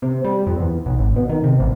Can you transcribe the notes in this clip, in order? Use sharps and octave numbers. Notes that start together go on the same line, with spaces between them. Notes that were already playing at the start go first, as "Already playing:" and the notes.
C3
G3
F2
E2
B1
G#1
B2
D#3
C3
A1